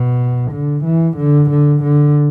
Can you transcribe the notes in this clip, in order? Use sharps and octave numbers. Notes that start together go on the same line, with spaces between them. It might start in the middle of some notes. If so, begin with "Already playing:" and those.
Already playing: B2
D3
E3
D3
D3
D3